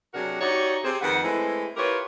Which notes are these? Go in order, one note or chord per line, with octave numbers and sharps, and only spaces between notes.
C3 F#3 D4 F#4 G#4 A#4
D#4 F#4 G4 C#5 D5 E5
C3 G#4 C5
F2 D#3 G#3 B4 F#5
E3 G#3 A3 C4 E4
E4 F4 G4 A#4 B4 C#5